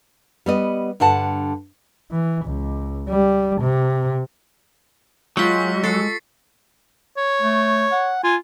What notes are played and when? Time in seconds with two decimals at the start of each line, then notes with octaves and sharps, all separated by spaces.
0.46 G3 B3 D#5
1.00 G2 D3 F#5 A5
2.11 E3
2.46 C#2
3.09 G3
3.62 C3
5.37 F#3 G#3 F4 G5 C#6 B6 C#7
5.84 A4 A6 C7 C#7
7.17 C#5
7.42 A3
7.92 F#5
8.24 F4 G#5